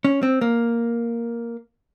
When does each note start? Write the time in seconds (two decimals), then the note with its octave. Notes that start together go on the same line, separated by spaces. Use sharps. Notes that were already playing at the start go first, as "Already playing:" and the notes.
0.05 C#4
0.23 C4
0.41 A#3